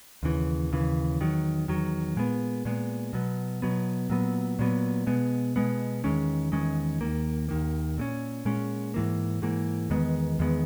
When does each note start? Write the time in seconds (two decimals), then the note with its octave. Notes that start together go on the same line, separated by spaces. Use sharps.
0.23 D#2 C#3 E3
0.72 D#2 C#3 E3
1.20 E2 D#3 F#3
1.68 E2 D#3 F#3
2.16 A#2 G#3 B3
2.65 A#2 G#3 B3
3.13 B2 F#3 B3
3.62 B2 F#3 B3
4.10 A#2 F#3 B3
4.59 A#2 F#3 B3
5.07 B2 G#3 B3
5.56 B2 G#3 B3
6.04 E2 D#3 G#3 C#4
6.52 E2 D#3 G#3 C#4
7.01 D#2 D#3 A#3
7.49 D#2 D#3 A#3
7.98 A#2 G#3 C#4
8.45 A#2 G#3 C#4
8.94 G#2 E3 A#3
9.42 G#2 E3 A#3
9.90 E2 D#3 G#3 B3
10.39 E2 D#3 G#3 B3